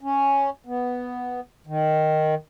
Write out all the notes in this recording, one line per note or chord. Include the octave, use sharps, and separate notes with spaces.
C#4
B3
D#3